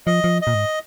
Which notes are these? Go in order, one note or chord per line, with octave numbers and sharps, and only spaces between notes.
F3 D#5
F3
D#5
A#2
G#2